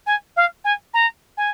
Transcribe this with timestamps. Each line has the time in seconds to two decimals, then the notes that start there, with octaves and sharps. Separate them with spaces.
0.06 G#5
0.36 F5
0.64 G#5
0.94 A#5
1.37 G#5